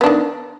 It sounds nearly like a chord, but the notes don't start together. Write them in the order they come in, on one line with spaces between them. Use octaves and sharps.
B3 D4 D#3